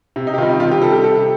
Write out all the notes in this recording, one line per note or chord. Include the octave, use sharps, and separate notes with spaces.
C3
D#4
G4
D#3 G3 F4
D#4
C3 F4
G4
G3 A4
G4
C3 A4